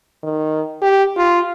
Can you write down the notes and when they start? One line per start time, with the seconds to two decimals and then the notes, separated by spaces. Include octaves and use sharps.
0.23 D#3
0.82 G4
1.17 F4